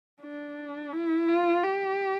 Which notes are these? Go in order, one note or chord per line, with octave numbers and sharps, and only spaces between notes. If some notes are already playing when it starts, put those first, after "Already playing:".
D4
E4
F4
G4